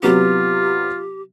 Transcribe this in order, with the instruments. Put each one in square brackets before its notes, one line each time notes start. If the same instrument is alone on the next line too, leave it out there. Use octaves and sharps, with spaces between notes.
[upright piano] C3 F#3 B3 [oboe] F4 [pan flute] G4